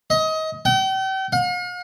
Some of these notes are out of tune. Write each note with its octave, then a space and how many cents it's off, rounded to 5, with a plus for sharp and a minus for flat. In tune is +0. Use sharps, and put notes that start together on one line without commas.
D#5 +25
G5 -40
F5 +45